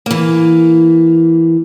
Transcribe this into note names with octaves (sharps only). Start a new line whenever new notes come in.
E3 A#3